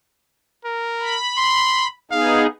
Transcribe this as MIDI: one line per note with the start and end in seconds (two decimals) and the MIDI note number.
0.65 1.17 70
1.00 1.87 83
1.37 1.87 84
2.11 2.47 59
2.11 2.47 63
2.11 2.47 68
2.11 2.46 77